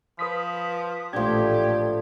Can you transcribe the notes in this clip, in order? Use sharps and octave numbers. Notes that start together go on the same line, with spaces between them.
F3 B4 D#6 B6
A1 A#2 F3 A3 D4 G4 G#6